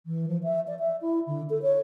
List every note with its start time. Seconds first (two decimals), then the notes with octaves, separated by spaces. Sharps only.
0.06 E3
0.28 F3
0.43 E5
0.67 D5
0.79 E5
1.02 E4
1.27 D3
1.50 A4
1.62 C#5